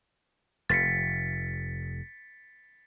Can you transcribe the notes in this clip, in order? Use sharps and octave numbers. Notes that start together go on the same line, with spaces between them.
F1 A6 B6 C#7